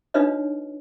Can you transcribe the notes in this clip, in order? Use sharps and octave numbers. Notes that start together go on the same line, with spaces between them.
D4 D#4 F4 B4 C#5 D#5